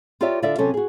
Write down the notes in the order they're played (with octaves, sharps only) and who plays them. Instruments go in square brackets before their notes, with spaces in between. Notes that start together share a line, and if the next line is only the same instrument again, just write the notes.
[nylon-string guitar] F4 G4 A#4 C#5 D5 E5
D3 F4 D5 E5
C3 F#3 C#4 A4
F#4 G#4